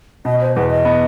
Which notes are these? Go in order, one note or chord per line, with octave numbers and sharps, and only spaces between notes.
B2 D#5
C5
E2 B4
D#5
B3